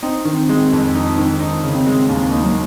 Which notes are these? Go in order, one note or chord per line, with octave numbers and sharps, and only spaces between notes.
C4 D#4
D#3
G#3
F2
D#4
D#3
D#4
C#3
C4
G#3
D#2 A#3
D#4
F#3